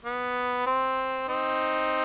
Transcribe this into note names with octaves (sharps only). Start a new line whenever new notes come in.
B3
C4
C4 D#4